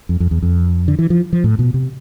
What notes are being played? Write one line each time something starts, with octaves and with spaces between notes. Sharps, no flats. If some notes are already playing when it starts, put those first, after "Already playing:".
F2
F2
E2
F2
D3
E3
F3
F3
A2
B2
C3